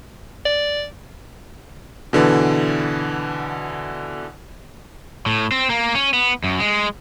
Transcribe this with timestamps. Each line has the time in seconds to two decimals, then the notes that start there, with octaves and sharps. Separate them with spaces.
0.46 D5
2.13 B2 D3 E3
5.26 A2
5.52 C4
5.70 A#3
5.95 C#4
6.13 B3
6.44 F#2
6.60 G#3